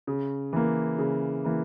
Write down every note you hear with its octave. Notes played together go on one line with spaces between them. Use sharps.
C#3
E3 A#3
C#3
E3 A#3